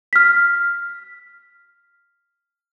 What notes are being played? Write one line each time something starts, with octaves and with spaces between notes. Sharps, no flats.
F6 B6